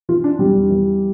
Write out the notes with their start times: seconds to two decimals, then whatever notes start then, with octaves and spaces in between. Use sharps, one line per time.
0.09 E3 F4
0.24 D4
0.39 E2 G3
0.70 E3